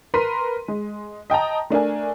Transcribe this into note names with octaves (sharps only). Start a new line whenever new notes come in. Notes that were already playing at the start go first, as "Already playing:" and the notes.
A#4 B4 A#5 C6 B6 D#7
G#3
D#5 G5 A5 A#5
A3 D4 A#4 G#5